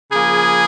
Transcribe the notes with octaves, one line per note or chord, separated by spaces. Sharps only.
C#3 F3 A#3 G#4